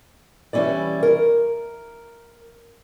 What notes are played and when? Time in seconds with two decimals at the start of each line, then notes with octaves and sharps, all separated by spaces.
0.53 E3 G3 C#4 E4 D5
1.03 A#4